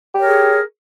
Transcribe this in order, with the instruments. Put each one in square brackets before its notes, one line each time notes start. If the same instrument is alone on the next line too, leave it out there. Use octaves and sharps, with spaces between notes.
[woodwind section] G4
C#5
A#4
G#4